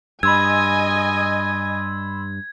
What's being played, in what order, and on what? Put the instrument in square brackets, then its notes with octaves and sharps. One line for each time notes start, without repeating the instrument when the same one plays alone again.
[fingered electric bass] G2 [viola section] D#5 G#5 [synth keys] B5 C6 E6 [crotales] G#6